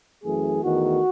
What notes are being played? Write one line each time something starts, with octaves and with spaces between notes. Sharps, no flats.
F#2 E3 A3 G#4
E2 D#3 A3 F#4